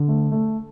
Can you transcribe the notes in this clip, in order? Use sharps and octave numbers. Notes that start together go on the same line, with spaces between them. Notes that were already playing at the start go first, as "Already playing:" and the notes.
Already playing: D3
A3
A3